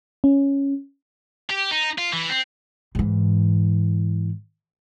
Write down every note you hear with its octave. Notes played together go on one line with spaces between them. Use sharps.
C#4
G4
D#4
F4
E3
C4
G#2 E3